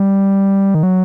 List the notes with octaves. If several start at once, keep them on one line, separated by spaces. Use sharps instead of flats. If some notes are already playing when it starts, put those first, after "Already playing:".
Already playing: G3
D#3
F#3